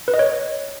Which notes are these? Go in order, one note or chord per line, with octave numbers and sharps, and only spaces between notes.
B4
D#5
C#5